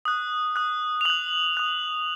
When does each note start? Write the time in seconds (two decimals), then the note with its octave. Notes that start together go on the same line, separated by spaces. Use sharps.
0.05 D#6 F#6
0.56 D#6 F#6
1.01 F7
1.05 D#6 F#6 F#7
1.57 D#6 F#6